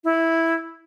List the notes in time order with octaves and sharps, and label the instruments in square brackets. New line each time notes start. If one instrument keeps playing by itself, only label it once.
[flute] E4